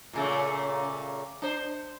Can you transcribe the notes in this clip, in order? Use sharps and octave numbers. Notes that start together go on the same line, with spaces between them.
A#2 C#3 A3
D4 C5